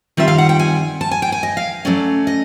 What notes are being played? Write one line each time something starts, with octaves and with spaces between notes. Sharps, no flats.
D#3 G3 C4 F4 E5
F5
F#5
G5
G#5
A5
G#5
G5
G#5
D#5
F5
F#3 A3 C#4 D5
D#5